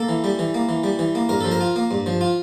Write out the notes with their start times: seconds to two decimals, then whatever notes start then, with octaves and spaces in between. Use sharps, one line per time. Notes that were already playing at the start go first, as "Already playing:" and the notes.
Already playing: A#3 A4
0.09 E3
0.24 G3
0.39 E3
0.54 A#3
0.69 E3
0.84 G3
0.99 E3
1.15 A#3
1.29 G2 A#4
1.41 F3 A4
1.52 A#4
1.61 F4
1.76 A#3
1.91 G2
2.06 F3
2.21 F4